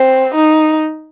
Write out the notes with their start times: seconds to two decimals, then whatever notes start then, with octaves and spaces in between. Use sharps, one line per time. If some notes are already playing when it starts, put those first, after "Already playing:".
Already playing: C4
0.35 D#4